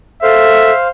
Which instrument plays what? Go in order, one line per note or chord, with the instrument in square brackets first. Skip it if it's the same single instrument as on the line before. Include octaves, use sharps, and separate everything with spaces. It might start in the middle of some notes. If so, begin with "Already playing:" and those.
[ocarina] A4 [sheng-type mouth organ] C5 F5 [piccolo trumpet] E5